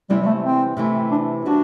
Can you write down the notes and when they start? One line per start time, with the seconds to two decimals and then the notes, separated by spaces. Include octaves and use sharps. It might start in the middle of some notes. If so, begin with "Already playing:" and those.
0.10 C3 E3 G3 B3 E4
0.22 G3
0.27 A3
0.44 C4
0.77 C3 E3 A3 E4
1.11 D4
1.45 C3 G3 B3 D4 F#4